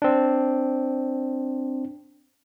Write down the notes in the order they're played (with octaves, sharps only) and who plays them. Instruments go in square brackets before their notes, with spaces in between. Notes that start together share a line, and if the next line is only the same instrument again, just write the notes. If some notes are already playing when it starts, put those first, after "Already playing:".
[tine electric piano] C4 D4